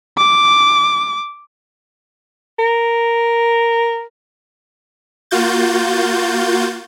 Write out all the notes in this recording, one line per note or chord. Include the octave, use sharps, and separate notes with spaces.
D6
A#4
A#3 F4 F#4 G6 A6